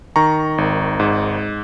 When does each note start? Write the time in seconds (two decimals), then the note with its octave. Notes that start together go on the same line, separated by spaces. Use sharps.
0.16 D#3 A#5 C#6
0.58 G#1
1.00 G#2